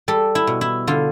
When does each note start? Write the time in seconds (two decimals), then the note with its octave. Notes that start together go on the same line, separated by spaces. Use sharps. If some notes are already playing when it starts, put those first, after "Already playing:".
0.08 G3 A4
0.35 E4
0.47 B2
0.61 E4
0.87 D3 F4